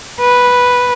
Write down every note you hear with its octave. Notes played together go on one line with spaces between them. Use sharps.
B4